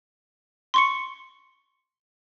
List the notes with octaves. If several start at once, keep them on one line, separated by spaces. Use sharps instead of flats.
C6 C#6 C#7